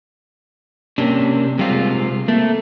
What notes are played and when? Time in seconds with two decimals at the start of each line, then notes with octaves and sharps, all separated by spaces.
0.98 C3 A#3 C#4 D4
1.59 C3 G3 G#3 F4 C5
2.28 A3 A#3